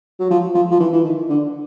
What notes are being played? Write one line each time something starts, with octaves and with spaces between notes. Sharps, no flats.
F#3
F3
F3
F3
E3
E3
D#3
D3